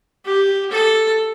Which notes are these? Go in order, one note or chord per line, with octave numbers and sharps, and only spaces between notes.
G4
A4